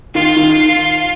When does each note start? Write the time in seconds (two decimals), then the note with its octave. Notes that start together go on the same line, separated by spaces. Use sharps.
0.15 D#3 F4
0.36 D#3